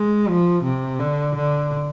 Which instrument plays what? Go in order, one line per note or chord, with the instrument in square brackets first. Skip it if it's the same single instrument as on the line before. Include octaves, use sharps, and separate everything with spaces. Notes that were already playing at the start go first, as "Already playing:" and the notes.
Already playing: [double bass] G#3
F3
C3
D3
D3